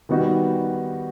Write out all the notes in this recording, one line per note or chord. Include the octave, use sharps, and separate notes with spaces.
D#3 G3 B3 D#4 F#4